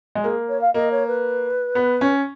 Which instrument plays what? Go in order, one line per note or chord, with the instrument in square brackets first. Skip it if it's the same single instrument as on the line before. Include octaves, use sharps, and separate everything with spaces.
[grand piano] G#3
[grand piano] A#3 [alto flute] G#4
[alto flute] C#5
F5
[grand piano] A#3 [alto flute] D#5
[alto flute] C#5
B4
[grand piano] B3
C#4